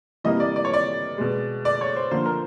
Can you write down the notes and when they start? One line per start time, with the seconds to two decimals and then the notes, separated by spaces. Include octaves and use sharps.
0.24 C3 E3 G3 A#3 D#5
0.40 D5
0.56 D5
0.65 C#5
0.74 D5
1.18 B2 G#3
1.65 D5
1.81 C#5
1.96 C5
2.11 D3 F3 A#3 C5
2.26 A#4